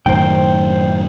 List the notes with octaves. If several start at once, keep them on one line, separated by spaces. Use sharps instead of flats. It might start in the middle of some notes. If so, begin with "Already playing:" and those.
F#2 A2 D#3 C5 G5